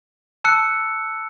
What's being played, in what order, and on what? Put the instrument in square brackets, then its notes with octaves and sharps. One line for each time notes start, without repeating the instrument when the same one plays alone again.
[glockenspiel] A5 E6 F#6 C#7